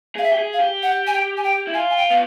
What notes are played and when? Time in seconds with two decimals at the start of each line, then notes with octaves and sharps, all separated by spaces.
0.16 G#4 F5
0.23 E5
0.33 G4
0.38 G#4
0.53 F5
0.60 G4
0.83 F#5
1.07 G#5
1.14 G5
1.37 G#5
1.44 G5
1.67 E4
1.74 F4 G#5
1.90 G#5
1.97 G5
2.10 B3 F5